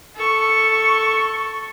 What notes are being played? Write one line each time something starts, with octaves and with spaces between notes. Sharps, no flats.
A4 C#6